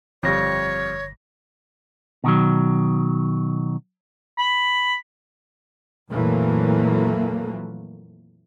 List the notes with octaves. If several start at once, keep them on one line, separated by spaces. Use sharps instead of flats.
G1 F2 G3 C#5 A#6
B2 D#3 F#3
B5
F2 A#2 E3 F#3 A3 A#3